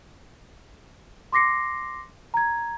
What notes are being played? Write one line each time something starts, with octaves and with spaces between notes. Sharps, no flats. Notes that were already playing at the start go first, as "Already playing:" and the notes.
C6 D6 A#6 C7 C#7
A#5 G#6